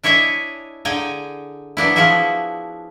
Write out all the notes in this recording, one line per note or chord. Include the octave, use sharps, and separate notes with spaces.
D4 E4 C#5 D#5 E5 G#5
D3 G#4 G5 G#5 A#5
F#3 B3 D4 E4
F3 E4 F#4 G#4 E5